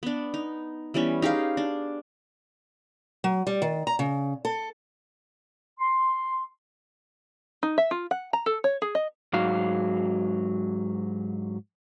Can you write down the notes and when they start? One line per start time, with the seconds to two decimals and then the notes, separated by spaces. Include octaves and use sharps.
0.03 B3 D4
0.34 D#4
0.94 E3 G3 B3 C#4
1.22 D#4 G4 G#4 F5
1.57 D4
3.24 F#3
3.47 G3
3.62 D#3
3.87 A#5
3.99 C#3
4.45 A4
5.79 C6
7.63 D#4
7.78 E5
7.91 F4
8.11 F#5
8.33 A#5
8.46 A4
8.64 C#5
8.82 G#4
8.95 D#5
9.33 G#2 F#3 F#4 F5